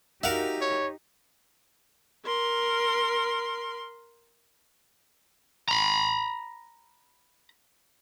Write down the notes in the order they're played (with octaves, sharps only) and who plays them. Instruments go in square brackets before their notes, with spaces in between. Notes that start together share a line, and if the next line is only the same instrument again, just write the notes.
[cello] D#4 G4 [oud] F#4 A#4 [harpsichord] E5 F5
[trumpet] C#5
[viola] A#4 C6
[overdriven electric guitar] A#5 B5